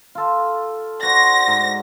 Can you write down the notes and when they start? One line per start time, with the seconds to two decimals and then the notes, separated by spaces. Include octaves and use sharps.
0.15 F4 A4
1.03 F#4 C5 D5 A#6
1.47 G#2